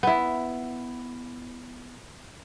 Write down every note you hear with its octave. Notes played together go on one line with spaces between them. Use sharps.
B3 E4